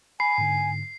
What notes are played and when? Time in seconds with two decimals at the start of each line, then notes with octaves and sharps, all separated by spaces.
0.20 G#5 B5 C7
0.38 G#2 D3